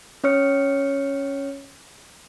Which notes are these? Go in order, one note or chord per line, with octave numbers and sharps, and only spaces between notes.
C#4 C#5 F6 C#7